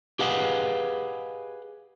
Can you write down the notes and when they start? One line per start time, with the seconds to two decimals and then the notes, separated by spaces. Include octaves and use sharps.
0.19 G4 G#4 B4 D#5 F5 F#5